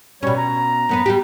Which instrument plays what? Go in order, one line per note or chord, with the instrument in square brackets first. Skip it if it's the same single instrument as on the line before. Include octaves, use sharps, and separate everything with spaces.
[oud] B2 C#4 [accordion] G3 C#5
[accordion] A#5
[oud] F#2 B3 B4
G3 F#4 G4